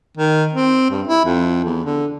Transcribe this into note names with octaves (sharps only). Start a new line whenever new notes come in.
D#3
C4
G2
E4
F2
E2
D3